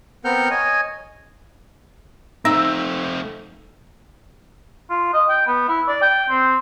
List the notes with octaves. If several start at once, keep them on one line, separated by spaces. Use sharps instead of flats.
B3 C4 A#4 F#5 F6 G6
C#5 D#5 G#5
A3 C4 D#4 E5
F4
D#5
G5
B3
E4
D5
G5
C4